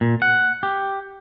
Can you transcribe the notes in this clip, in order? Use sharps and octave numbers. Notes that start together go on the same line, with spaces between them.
A#2
F#5
G4